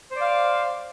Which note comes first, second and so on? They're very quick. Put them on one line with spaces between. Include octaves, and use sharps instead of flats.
C5 D5 F5